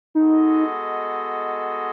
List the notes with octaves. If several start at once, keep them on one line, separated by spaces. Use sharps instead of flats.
G#3 B3 D#4 F#4 A4 D#5